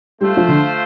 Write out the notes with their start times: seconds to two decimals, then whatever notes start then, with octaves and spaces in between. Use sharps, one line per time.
0.21 G3 A3 F4 C5
0.37 F3
0.48 D3